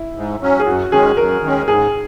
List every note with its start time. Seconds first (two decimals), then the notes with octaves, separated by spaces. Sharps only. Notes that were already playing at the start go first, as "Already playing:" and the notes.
Already playing: E4
0.16 G#2
0.41 F#3 C#4
0.60 G#4
0.66 F#2 F#4
0.92 D#3 G#3 C#4 G#4
1.17 F#2 A#4
1.42 D#3 G#3 C#4
1.67 G#2 G#4